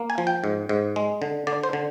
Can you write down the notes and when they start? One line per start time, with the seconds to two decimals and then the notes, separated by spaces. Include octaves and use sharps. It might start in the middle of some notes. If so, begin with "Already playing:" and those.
Already playing: A#3
0.10 G#5
0.18 F3
0.27 G5
0.44 G#2
0.69 G#2
0.96 G#3
1.22 D3
1.47 D3 D5
1.64 C5
1.73 D3